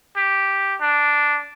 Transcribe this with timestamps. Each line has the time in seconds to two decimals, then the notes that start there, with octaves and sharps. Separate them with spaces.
0.17 G4
0.81 D4